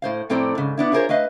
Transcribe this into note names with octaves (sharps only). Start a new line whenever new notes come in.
A2 C5 F5
F2 A2 C4 A4 D5 A#5
G#2 C#3
B3 D4 E4
D#4 F4 G#4 A#4 C5 C#5
A3 B4 D#5 F5